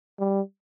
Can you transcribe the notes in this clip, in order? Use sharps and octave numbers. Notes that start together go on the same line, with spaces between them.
G3